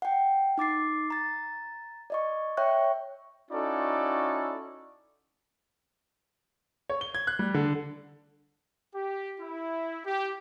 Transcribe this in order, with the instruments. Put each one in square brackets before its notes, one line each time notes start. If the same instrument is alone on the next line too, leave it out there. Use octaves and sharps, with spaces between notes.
[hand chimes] F#5 G5
D#4 D6 A6 C7
A#5 A6
D5 D#5 C#6
C#5 E5 G5 C#6 F#6
[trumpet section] C#4 D#4 E4 F#4 A4 D5
[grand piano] C#5
G7
G#6
F#6
G3
D3
[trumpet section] G4
E4
G4